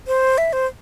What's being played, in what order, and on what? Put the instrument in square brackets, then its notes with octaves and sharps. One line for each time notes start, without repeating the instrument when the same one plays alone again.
[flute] C5
E5
C5